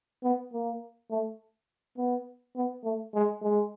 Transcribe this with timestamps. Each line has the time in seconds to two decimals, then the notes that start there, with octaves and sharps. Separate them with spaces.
0.23 B3
0.53 A#3
1.11 A3
1.98 B3
2.56 B3
2.84 A3
3.14 G#3
3.42 G#3